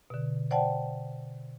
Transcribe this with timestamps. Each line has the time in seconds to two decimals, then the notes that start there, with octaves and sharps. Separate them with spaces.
0.10 B2 D3
0.51 C5 D5 F#5 G5 A5